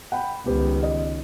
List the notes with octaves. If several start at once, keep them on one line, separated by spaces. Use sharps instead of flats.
F#5 G5 B5
C#2 D#3 B3 G4 B4
D#5